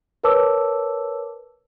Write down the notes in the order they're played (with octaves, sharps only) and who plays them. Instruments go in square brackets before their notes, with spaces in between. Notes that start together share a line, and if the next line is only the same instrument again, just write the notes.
[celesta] A#4 B4 C#5 A5 D6 E6